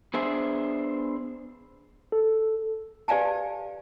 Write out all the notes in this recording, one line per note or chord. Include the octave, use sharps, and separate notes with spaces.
B3 D4 G#4 C5 E5
A4
G4 B4 D5 F5 G#5 A5